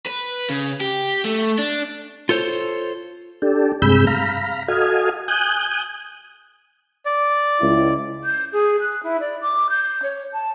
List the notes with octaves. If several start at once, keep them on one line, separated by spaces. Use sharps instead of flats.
B4
C#3
G4
A3
D4
F4 A4 C5 C#5
D4 G4 A4
G2 C3 G#3 B5 E6 G6
F5 A#5 B5
F#4 A4 D#5 F5 G#5
G#5 D#6 F#6 G6
D5
C#2 E4
G6
G#4
F#6
E4
D5
D6
G6
C#5
A5